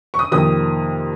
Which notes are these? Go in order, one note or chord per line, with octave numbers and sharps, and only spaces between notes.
C#6
D#6
F2 C3 D#3 A#3 D#6